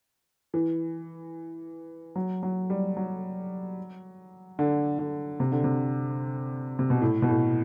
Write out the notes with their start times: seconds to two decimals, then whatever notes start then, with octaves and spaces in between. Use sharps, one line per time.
0.54 E3
2.16 F#3
2.43 F#3
2.70 G3
2.97 F#3
4.59 D3
4.99 D3
5.40 C3
5.52 D3
5.64 C3
6.79 C3
6.90 B2
7.02 A2
7.22 B2
7.29 A2